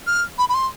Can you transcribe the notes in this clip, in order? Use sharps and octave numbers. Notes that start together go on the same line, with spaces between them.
F6
B5
B5
C6